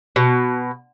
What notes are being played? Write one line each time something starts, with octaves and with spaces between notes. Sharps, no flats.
B2